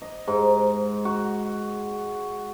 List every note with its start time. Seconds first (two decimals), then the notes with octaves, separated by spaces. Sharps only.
0.02 D#5
0.28 G#2
1.05 F#4